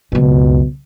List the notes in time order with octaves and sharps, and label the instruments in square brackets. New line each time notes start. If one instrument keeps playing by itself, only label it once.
[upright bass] C#2 F#2 [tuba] B2